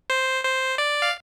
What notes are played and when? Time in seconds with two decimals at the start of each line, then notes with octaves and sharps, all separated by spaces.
0.10 C5
0.44 C5
0.78 D5
1.02 F5